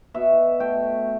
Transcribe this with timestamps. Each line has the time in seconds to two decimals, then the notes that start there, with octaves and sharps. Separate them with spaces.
0.14 B2 E5
0.60 A3 G5